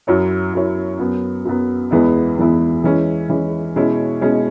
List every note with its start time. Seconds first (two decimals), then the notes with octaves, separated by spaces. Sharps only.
0.07 F#2 F#3 E4 C#5
0.53 F#2 F#3 E4 C#5
0.99 F#2 F#3 B3
1.45 F#2 F#3 B3
1.91 E2 E3 G#3 B3 E4
2.37 E2 E3 G#3 B3 E4
2.84 E3 G#3 C#4 E4
3.29 E3 G#3 C#4 E4
3.76 B2 G#3 C#4 E4 C#5
4.21 B2 G#3 C#4 E4 C#5